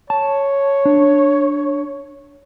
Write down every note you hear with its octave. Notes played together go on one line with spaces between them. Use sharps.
C#5 A5
D4